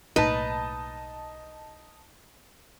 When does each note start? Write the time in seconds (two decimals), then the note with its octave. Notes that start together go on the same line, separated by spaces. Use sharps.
0.16 B1 A2 A#3 D#4 B4 D#5 A5